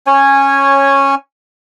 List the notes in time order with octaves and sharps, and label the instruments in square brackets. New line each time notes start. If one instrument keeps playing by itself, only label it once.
[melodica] C#4 C#5 G#5